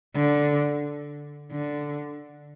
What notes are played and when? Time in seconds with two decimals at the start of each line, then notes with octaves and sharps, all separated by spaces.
0.16 D3
1.52 D3